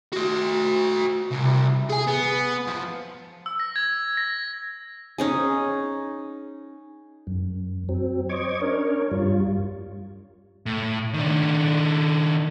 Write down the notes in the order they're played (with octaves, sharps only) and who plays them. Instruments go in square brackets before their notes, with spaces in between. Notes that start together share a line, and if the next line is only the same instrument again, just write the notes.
[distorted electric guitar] F#4 C5
C2
G#4 G#5
B3
F3
[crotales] E6
A#6
G#6
A#6
[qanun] C#4 D#4 G#4
[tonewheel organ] F#2
F#3 C4
C5 C#5 D#5 C#6 D6 G#6
C#4 D4 A#4 C#5
G2 G3 F4
[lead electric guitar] A2
D#3 D4